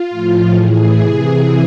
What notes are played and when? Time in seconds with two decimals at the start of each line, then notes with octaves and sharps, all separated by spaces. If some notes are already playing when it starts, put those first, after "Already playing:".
Already playing: F4
0.10 A2 F3
0.54 A2 E3 G#4
0.98 C3 E3